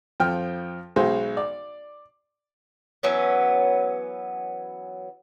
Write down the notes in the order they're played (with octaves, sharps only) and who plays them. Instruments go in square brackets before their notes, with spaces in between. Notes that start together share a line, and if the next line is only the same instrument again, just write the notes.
[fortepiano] F2 F3 G5 F6
B1 G#3 F#4 C5
D5
[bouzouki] E3 F#3 B3 C#4